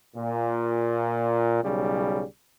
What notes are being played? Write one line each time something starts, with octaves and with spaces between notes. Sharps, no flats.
A#2
B1 C#3 G3